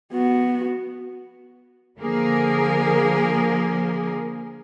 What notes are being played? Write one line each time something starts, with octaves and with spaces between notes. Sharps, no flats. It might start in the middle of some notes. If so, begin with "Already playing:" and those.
B3 F#4
D3 F3 A#3 G#4 A#4